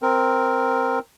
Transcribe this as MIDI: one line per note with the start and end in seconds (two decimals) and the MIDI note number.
0.02 0.99 60
0.02 0.99 70